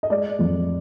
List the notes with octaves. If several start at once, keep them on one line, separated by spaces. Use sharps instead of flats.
D#5
G#3 D5
F2